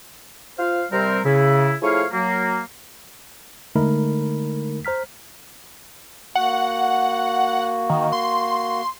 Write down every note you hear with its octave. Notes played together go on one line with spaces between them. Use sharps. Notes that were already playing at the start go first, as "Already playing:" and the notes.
F4 C5 F5
C3 G3 C4 A#4
C#3 E4
F3 A3 E4 G#4 C#5 F5
F#3 A#3
D3 G#3 A3 D#4 A#4 B5
C5 A#5 F6 B6
A#3 F#4 F#5
D#3
C6